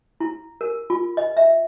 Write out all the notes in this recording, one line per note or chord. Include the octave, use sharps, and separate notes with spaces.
E4
A#4
F4
D#5
E5